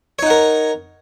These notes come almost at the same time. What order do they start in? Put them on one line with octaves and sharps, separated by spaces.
C#5 D#4 F#5 A#4